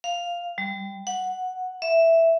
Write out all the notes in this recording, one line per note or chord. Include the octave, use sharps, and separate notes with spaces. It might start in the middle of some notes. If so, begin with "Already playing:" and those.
F5
G3
F#5
E5